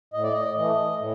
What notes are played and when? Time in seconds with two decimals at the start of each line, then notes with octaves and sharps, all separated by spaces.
0.13 A2 D#5
0.23 D5
0.33 D#5
0.56 E3 A3 D#5
1.00 A2